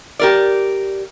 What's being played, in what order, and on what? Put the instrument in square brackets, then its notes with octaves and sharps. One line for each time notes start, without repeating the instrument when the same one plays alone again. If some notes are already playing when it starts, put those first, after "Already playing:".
[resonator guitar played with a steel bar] G4 A#4 D5